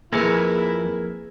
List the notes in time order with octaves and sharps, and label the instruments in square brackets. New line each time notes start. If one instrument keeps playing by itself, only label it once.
[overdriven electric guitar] C2 F2 [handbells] A#3 G#4 B4 [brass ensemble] E4 [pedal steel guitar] A#4 G#5